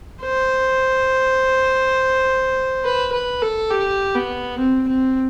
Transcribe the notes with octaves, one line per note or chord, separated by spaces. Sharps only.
C5
B4
B4
A4
G4
B3
C4
C4